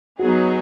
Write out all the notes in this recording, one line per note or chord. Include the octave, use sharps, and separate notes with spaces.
F#3 B3 D#4 F#4 G#4